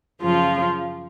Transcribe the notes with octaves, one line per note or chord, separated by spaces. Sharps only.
F#2 C#3 F3 F4